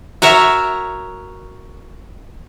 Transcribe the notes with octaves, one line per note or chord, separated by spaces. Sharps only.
F#4 A#4 C#5 E5